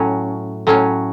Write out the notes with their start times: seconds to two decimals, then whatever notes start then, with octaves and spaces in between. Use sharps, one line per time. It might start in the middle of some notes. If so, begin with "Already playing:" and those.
Already playing: A2 F#3 C#4
0.67 A2 F#3 C#4